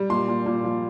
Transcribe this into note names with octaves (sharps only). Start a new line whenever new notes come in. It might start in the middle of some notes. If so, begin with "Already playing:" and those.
Already playing: G3
A#2 C6
A#2
A#2
F3